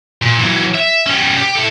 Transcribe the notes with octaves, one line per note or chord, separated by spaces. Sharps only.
A#2
E3 F#3
E5
G3 C#4
G4
E4 A4